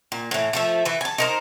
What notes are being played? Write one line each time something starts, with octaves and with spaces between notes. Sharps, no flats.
A#2
A2 E3
F3 A3 E5
E3 B4
G#5 A5
D#4 A#4 C5